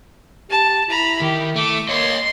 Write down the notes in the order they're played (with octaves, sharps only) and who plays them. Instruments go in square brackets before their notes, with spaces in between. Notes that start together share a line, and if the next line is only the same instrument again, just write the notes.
[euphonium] G4 [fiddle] A5
[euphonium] E4 [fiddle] A#5 B5
[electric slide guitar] D#3 [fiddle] G4
[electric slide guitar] A3 [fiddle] D6
[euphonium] A#3 [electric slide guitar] C#5 D#5 [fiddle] C6